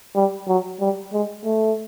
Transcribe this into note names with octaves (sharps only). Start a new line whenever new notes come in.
G3
F#3
G3
G#3
A3